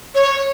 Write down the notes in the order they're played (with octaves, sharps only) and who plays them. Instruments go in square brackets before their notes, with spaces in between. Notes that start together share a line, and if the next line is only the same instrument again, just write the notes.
[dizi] C#5